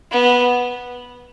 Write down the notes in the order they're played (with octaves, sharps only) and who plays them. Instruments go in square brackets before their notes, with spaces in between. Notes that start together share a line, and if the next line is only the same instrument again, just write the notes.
[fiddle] B3